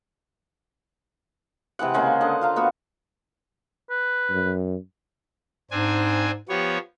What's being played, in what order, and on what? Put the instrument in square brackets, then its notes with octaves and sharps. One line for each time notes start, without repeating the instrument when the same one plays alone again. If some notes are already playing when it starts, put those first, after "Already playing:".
[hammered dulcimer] C3 E3 G#3 F#5
C#3 G#3 A#3 C5
D3 D#5 A5
F4 F5 A#5
A#3 B3 F#4
[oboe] B4
[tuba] F#2
[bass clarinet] G#2 [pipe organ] C4 D4 G#5
[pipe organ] F3 B3 C#5 [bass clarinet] G4